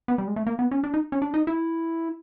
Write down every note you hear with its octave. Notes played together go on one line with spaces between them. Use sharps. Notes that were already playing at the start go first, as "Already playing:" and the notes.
B3
G3
G#3
A3
A#3
B3
C#4
D4
D#4
C#4
D4
D#4
E4